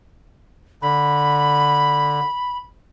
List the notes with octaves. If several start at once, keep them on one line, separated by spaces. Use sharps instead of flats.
D3 B5